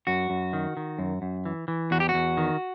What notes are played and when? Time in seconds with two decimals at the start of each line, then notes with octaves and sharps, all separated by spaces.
0.07 F#2 F#4
0.30 F#2
0.53 D#3
0.77 D#3
0.99 F#2
1.22 F#2
1.46 E3
1.68 E3
1.91 E2 F#4
2.00 G4
2.09 F#4
2.14 E2
2.37 D#3